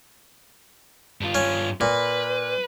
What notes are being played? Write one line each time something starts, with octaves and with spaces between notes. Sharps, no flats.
G2 F4
C#4
A#2 B4